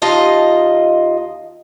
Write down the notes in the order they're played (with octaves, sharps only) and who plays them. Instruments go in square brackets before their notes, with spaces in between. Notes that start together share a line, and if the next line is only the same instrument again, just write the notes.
[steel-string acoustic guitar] D#2 F4 D#5 A5 A#5